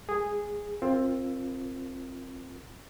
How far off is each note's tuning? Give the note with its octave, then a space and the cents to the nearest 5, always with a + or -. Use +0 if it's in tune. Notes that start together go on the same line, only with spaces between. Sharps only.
G#3 +0 G#4 -10
C4 +20 F4 +0 A#4 +0